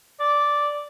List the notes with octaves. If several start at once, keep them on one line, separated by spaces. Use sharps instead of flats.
D5